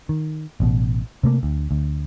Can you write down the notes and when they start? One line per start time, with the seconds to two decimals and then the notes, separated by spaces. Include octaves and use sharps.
0.09 D#3
0.60 A1 B2
1.23 C3 A3 A#3
1.43 D2
1.71 D2